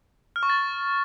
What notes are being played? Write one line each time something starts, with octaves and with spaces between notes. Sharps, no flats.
F6
C#6
A6